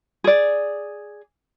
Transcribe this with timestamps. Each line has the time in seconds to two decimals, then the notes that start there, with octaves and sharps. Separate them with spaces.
0.24 G#4 D5